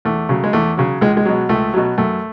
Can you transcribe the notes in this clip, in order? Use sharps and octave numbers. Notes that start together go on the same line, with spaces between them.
E2 A3
C#3 F#3
G#3
E2 A3
C#3 F#3
C#2 G#3
G#3
B2 F#3
C#2 A3
B2 F#3
F#2 A3